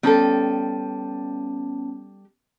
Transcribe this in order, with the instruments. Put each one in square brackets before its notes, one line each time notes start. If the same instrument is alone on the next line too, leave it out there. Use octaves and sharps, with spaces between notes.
[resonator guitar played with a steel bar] G3 A4 [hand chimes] B3 C#4 A5